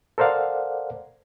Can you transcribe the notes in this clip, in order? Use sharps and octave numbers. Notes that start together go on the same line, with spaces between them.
A4 A#4 C5 D5 F5 F#5